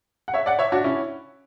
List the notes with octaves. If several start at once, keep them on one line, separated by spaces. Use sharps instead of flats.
F#5
C#5 E5
D5 F#5
C#5 E5
D4 F#4
C#4 E4